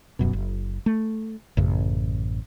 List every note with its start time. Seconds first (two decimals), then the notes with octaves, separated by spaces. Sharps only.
0.19 D#1 F#2 B2
0.33 F#1
0.86 A3
1.57 A1 F#2 C#3